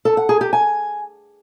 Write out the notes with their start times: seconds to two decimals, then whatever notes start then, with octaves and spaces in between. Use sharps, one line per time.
0.05 A4
0.17 F#5
0.29 G#4
0.41 G4
0.53 G#5